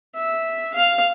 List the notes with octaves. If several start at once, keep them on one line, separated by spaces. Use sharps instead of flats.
E5
F5